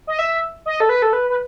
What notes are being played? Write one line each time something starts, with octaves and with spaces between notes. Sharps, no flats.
D#5
E5
D#5
A4
B4
A4
B4
B4